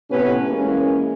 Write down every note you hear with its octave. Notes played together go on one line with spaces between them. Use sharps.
A2 C3 B3 C#4 G4 B4
E3 G#3 A#3 C#4